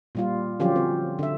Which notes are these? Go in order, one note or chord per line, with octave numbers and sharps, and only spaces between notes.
A#2 G3 F4
D3 F3 F#3 C#4 F4 G4
C4
D3 E5